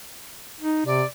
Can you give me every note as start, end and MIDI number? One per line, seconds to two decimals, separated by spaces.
0.61 0.85 63
0.86 1.03 48
0.86 1.06 74